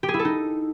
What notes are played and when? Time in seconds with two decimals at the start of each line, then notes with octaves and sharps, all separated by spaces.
0.03 G4
0.08 G#4
0.14 E4
0.19 A4
0.25 D#4